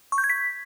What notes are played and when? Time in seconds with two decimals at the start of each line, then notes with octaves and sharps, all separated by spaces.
0.12 C#6
0.18 G6
0.24 G#6
0.30 B6